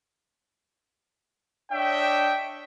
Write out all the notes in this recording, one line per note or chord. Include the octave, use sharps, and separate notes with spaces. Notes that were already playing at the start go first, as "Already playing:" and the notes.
D4 C#5 D#5 E5 G5